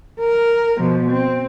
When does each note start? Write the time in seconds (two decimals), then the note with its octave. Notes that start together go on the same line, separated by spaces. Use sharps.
0.20 A#4
0.79 B2 F3
1.11 C4